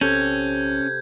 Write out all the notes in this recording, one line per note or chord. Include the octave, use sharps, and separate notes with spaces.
A#1 C3 C#4 A4 G6 G#6